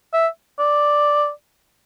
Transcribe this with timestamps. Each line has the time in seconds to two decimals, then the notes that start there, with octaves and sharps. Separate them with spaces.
0.13 E5
0.59 D5